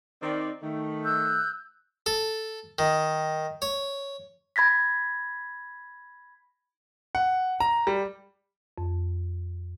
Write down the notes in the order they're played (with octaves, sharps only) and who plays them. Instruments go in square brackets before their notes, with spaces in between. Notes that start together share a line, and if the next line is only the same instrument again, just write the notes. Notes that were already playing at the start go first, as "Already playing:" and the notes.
[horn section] D#3 C4 D5
D#3 A3
[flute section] E6 F#6 G6
[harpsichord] A4
D#3
C#5
[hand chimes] B5 G#6 A#6 B6
[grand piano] F#5
A#5
G3
[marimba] F2